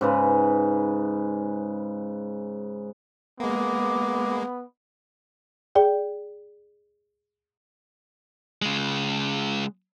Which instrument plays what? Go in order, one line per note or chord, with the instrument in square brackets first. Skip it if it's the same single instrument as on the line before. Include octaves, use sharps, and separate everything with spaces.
[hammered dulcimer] G#2 C#3 B4
[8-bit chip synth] G#3 A#3 [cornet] B3 [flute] D6
[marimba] G#4 D5 G5
[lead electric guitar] C#3 G#3